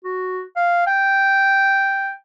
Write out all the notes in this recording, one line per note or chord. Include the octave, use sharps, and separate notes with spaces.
F#4
F5
G5